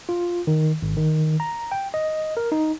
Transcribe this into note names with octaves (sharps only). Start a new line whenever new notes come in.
F4
D#3
G#1
D#3
A#5
G5
D#5
A#4
D#4